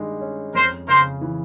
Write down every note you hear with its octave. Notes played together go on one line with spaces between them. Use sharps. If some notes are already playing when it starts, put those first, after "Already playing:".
Already playing: G2 D#3 G#3
C#4
F2 A#4 C5
C#3 A#4 C5
E3